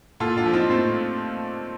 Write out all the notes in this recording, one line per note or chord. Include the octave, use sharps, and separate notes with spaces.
A#2 F4 A4
D4 F4
F3
C4 D#4
A#2 A3 C4